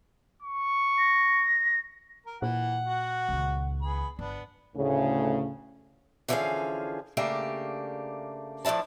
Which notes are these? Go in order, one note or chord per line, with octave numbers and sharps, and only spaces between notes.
C#6
A#6
A#4
A#2 E3 F#5
F#4
C#2 D#3
B3 G#4 B5
G1 B3 D4
D2 A2 C#3
D3 E3 F3 C#4 G#4 F5
C#3 A3 A#3 D4 G4
A2 F3 D4 E4 A5